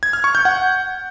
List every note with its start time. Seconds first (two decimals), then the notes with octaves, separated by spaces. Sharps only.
0.03 G#6
0.13 F6
0.24 C#6
0.35 G6
0.45 F#5